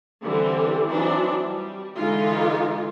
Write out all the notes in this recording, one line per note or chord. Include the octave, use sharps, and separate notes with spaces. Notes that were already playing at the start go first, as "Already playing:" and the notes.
D3 E3 G3 C4
E3 F#3 C4 D4 D#4
G3
D3 E3 G#3 D#4 F4